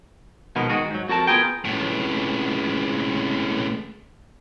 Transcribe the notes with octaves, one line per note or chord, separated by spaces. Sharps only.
B2 D#3 F3 G#3 B3 A#4
D#3 G#3 F#4 G#4
G#2 F#3
F2 F#4 A4 A#4 A5
B3 F4 G#4 A#4 G5
C#2 A2